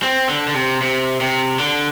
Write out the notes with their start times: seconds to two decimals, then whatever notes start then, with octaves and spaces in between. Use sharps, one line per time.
0.03 C4
0.28 D3
0.48 D3
0.54 C3
0.81 C3
1.21 C3
1.59 D3